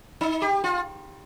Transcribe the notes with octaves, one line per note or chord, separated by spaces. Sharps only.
D#4
G4
F4